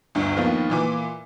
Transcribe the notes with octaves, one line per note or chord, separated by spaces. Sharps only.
G1 D2 G2
D#2 D#3 F3 A#3 B3
A#2 E3 D6